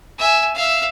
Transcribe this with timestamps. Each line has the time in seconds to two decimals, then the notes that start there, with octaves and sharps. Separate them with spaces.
0.19 E5 G#5
0.55 E5 F5